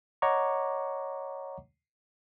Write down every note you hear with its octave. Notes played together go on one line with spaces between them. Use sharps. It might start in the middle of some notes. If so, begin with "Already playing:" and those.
C#5 D#5 F#5 A#5 C#6 D6